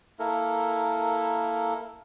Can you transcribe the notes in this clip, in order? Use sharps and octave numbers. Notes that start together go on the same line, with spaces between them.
A#3 E4 A4 A#4